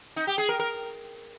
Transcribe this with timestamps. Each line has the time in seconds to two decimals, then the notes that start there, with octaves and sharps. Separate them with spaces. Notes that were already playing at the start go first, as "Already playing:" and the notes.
0.16 D#4
0.27 G4
0.38 G#4
0.49 A#4
0.59 A#4